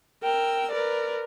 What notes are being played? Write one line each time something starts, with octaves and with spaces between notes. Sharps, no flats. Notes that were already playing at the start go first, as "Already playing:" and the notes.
A#4 G5 E6
A#4 B4 D5